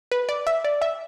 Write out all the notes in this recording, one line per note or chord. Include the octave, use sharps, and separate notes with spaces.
B4
D5
E5
D5
E5